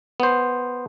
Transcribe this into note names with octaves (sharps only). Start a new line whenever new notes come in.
B3 C5